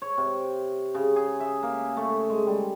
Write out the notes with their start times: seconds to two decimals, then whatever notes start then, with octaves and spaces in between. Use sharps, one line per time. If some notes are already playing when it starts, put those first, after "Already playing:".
0.02 C#5
0.18 C3
0.95 C#3
1.16 G#4
1.40 E5
1.63 A#3
1.97 A3
2.30 G#3
2.47 G3